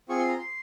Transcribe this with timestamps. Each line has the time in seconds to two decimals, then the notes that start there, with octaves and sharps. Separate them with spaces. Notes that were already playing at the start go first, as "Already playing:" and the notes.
0.09 C4 F4 G#4 C#6
0.19 C6
0.28 A#5
0.38 C6